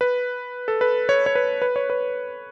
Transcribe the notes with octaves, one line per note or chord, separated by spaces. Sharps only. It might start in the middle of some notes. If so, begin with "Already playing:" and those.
B4
A4
B4
C#5
C#5
B4
B4
C#5
B4